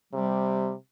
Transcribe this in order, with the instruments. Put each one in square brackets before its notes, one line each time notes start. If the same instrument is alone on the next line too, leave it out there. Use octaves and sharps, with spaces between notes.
[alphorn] C3 [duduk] G3